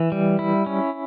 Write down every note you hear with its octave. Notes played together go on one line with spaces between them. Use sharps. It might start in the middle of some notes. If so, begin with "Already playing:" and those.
Already playing: E3
G3
E4
C#4